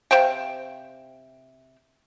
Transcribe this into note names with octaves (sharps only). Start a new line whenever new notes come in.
C3 C5 F5 G5